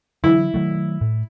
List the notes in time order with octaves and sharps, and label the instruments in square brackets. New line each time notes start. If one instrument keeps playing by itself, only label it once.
[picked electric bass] D3 E3 F#3 [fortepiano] E4
[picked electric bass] D#3 F#3 A3
A2